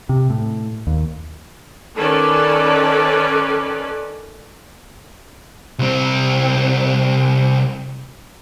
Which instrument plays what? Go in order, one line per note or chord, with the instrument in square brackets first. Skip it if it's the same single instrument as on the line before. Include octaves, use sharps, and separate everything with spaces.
[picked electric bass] C3
A2
D#2
[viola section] D#3 C#4 A4 B4 D5
[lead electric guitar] C2 C4